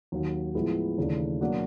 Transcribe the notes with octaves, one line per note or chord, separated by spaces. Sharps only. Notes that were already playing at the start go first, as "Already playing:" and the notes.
D#2 D#3 F#3
A2 F3 G#3 B3 E4
D#2 C#3 E3 A3 D4
B2 F#3 A#3 D4 F#4